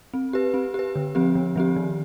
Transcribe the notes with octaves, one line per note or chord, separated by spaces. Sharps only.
C4
G4 B4
C4
G4 B4
D3
F3 C4 G4
D3
F3 C4 G4
D#3